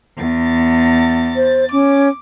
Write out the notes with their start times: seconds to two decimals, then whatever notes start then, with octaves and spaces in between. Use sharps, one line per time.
0.17 E2 A6
1.36 C5
1.72 C#4 D6